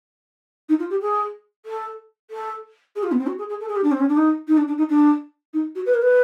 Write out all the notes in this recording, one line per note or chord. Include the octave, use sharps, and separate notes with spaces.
D#4
F4
G4
G#4
A4
A4
G#4
F4
B3
C4
F#4
G#4
G#4
A4
G#4
G4
D4
C4
C#4
D4
D#4
D#4
D4
D4
D#4
D4
D#4
F#4
B4
A#4
B4